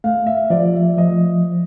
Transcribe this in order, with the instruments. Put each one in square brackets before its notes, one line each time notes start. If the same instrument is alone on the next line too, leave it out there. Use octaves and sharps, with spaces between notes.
[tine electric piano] A3 [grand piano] F5
[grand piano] E5
[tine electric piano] F3 [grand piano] D5
[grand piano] E5
[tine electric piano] F3 [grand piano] D#5
[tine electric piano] F3